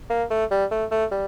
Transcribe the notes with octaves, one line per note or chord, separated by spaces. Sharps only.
A#3
A3
G3
A3
A3
G3